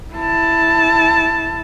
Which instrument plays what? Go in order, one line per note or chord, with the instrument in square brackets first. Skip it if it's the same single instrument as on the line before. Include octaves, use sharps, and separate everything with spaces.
[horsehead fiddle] E4 A5